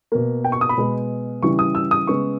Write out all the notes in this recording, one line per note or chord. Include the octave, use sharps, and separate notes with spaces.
B2 A#3
G5
C#6
D#6
B5
B2 G#3 B3
C#3 E3 G3 C#6
D#6
E6
D#6
C#3 G#3 B3 C#6